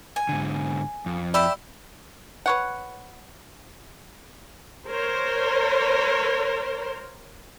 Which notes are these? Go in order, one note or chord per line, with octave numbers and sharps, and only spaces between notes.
G#5
G#2 D3
F2
G4 D5 E5 B5 E6
B4 C#5 F#5
A#4 C5 C#5